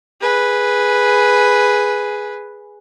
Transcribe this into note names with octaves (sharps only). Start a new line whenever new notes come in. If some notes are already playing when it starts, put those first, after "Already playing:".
G#4 B4